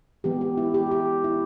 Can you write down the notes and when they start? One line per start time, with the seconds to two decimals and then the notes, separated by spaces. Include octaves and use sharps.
0.24 E3 G#3 B3 G4
0.41 G4
0.57 E4
0.74 G4
0.91 G4
1.24 E4